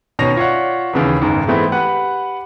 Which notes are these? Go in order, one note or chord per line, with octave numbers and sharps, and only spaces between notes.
B2 D#3 C#4 A#6 F7
F4 C#5 D5 E5 F#5
D#2 C#3 E3
F#1 B1 G#2 D#3
E3 G#3 A3 B3 C4 E4
G4 B4 F#5